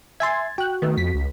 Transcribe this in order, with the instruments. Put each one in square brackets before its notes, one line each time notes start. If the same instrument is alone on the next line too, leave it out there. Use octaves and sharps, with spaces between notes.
[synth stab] E5 G#5 C6 [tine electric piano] G#6 A6
[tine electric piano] F#4 [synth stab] G5 F#6
[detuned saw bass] D#3 [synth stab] A3 B3
[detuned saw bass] F2 [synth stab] B6
[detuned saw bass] C#2